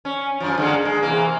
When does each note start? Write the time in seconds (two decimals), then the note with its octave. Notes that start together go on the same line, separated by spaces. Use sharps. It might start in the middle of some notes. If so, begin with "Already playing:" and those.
0.05 C#4
0.40 F#2 F3
0.58 D3 G#3 A#3
0.85 G#3
1.03 C3 E3 A#3